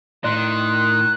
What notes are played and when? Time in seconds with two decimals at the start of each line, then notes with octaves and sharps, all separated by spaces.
0.24 A2 D#3 D5 C6 F#6